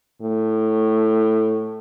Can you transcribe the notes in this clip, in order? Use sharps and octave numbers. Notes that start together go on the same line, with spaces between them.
A2